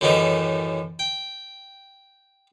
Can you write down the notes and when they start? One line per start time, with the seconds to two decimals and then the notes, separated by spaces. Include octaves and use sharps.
0.01 F#2 A2 D#3 E3 G3 D#4
0.99 G5